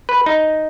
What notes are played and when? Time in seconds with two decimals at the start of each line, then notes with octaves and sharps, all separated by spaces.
0.09 B4
0.26 D#4